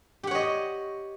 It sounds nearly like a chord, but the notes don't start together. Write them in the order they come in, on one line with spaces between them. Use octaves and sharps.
G4 F#5 C#5 D#5